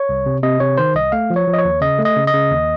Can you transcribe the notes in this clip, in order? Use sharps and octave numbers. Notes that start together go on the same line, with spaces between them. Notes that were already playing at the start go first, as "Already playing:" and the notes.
Already playing: C#5
C2
C3
C3 D#5
C3 C#5
D#3 C5
C2 D#5
A3 F5
F3
C#5
F3
D#5
C#5
D#2
C#3 D#5
A3
D#5
C#3
D#5
C#3
D#2